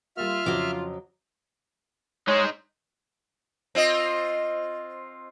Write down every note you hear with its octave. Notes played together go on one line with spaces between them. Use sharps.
G3 A#3 F4 E5 F6
F2 C#3 F#3 D6
G#3 D#4 C5 C#5
C4 F4 D#5